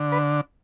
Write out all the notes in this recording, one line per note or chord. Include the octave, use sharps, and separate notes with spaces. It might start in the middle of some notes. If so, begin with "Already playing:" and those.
Already playing: D3
B4